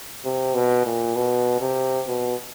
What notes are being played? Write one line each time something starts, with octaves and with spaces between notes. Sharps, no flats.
C3
B2
A#2
B2
C3
B2